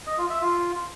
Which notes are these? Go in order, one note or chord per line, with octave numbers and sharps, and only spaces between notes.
D#5
F4
E5
F4